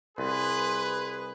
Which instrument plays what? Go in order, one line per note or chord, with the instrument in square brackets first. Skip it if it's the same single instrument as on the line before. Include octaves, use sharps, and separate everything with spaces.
[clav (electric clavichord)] C2 [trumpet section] G#4 B4 [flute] C6